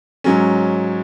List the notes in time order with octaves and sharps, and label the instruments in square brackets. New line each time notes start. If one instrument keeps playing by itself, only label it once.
[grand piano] G#2 F#3 C#4